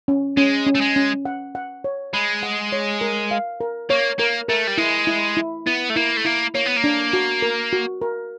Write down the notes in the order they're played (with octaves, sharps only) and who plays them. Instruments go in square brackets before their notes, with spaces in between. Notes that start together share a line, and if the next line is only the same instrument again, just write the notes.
[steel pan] C#4
[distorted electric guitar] G#3 [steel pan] C#4
[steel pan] C#4
[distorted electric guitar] A3
G#3
[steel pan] C#4
F#5
F#5
C#5
[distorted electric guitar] G#3 [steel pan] B5
[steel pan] F#5
C#5
A#4
F5
A#4
[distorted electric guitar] A#3 [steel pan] C#5
[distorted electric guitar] A#3 [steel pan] A#4
[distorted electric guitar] A3 [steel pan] A#4
[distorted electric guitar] G3
[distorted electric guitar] G#3 [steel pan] E4
[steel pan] E4
E4
[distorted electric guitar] B3 [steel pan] E4
[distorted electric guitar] A3
[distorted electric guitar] A#3 [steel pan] E4
[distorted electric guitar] A3
[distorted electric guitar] A#3 [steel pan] E4
[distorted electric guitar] A#3 [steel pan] C#5
[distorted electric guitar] B3
A#3
[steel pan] D4
F#4
A#4
F#4
A#4